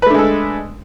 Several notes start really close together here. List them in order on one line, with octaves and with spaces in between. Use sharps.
B4 A3 D4 G#3 A4